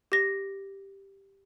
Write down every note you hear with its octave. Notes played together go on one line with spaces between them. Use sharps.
G4 A#6